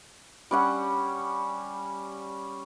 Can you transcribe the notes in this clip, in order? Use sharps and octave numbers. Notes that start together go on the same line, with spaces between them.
G3 C#4 F#5